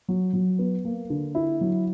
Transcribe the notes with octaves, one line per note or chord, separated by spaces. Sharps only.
F#3
F#3
B3
A#3
D3
E4
F#3